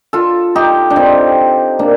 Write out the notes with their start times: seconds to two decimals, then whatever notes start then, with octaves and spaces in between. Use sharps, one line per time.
0.13 F4 A4
0.56 D#4 G4
0.90 D4
0.96 C4 D#4
1.79 A#3 D4